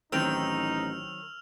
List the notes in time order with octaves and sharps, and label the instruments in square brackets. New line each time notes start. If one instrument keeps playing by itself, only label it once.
[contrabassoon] A1 [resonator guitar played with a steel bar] D#3 F#3 C4 [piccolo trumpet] D#4 [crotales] E6 F6 F7